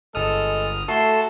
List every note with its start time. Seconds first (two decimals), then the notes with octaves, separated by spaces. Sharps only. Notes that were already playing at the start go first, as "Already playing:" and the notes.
0.15 G1 G#3 A4 D#6 F6
0.88 A3 E4 F#4 A4 C6